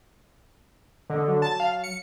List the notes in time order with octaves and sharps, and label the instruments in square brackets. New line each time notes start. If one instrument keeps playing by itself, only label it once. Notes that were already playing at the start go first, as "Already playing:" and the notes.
[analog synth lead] D3 [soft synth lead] D#5
[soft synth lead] F#3
[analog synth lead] A5
F5
C#7